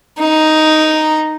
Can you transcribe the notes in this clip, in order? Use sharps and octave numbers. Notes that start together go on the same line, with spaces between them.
D#4